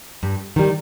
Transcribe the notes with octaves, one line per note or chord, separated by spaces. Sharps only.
G2
D#3 G3